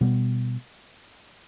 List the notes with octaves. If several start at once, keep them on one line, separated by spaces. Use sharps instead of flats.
B2 G3 B3